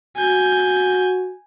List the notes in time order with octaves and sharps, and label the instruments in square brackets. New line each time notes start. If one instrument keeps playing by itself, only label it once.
[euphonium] F#4 [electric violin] G#5 G6